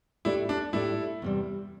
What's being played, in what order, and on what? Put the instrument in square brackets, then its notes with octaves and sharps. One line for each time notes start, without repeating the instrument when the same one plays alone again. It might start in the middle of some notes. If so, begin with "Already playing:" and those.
[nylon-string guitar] A2 A3 D4 G4 D5 [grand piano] E4
[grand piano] D4
[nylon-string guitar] A2 A3 D4 G4 D5 [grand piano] E4
[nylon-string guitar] E2 C3 G3